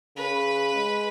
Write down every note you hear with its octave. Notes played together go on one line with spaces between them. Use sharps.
C#3 B4
G#3